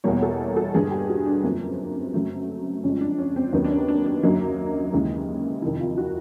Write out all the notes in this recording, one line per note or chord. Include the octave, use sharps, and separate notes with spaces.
E2 B2 G3 A#3 C#5
A4
A4
G2 D3 G3 G#4
G4
F#4
D4
F#2 D3 F3 A#3 C4
F#2 C#3 F#3 A3
F2 C#3 F3 G#3 C#4
D4
C#4
C4
D#2 D#3 F#3 B3 C#4
D4
C#4
D4
D4
F#2 D3 F#3 A#3 D#4
D#2 C#3 E3 G#3
F2 C3 D#3 E4
F4
F#4